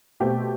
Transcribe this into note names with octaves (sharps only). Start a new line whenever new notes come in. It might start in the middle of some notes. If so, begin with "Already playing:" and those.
B2 A3 C4 G4